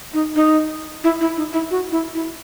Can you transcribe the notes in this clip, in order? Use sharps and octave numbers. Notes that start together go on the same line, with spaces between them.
D#4
D#4
E4
E4
D#4
E4
F#4
E4
E4